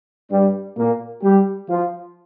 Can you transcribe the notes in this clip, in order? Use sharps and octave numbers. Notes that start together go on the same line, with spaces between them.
G2 G3
A#2 A#3
G3 G4
F3 F4